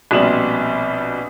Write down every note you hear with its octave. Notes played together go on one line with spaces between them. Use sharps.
A#1 B2 G3 C4 E7 F#7